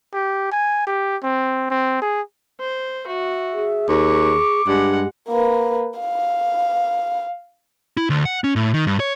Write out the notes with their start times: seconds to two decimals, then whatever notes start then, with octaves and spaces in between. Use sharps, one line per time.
0.13 G4
0.52 G#5
0.87 G4
1.23 C4
1.70 C4
2.02 G#4
2.60 C5
3.07 F#4 E5
3.53 G#4
3.89 D#2 C#6 D6
4.68 G2 G#3 G4 F#5
5.29 A#3 B4
6.00 F5
7.97 E4
8.10 D2
8.25 F#5
8.44 C#4
8.56 A2
8.74 D#3
8.87 G2
9.00 C#5